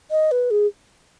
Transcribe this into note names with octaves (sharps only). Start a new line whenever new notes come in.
D#5
B4
G#4